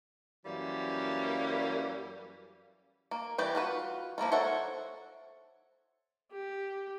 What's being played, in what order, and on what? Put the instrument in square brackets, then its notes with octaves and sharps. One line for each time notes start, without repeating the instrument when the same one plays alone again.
[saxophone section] F#2 E3 G3 A#3
[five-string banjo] A#3
E3 G3 G4 D5
F4 F#4 B4
F3 A#3 E4 F4
A4 C5 C#5 E5 F#5
[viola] G4